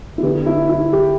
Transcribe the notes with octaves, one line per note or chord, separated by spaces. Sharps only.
E4
D3 B3 G4
E4
E4
G4